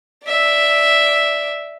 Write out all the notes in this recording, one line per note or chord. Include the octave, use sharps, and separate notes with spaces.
D5 E5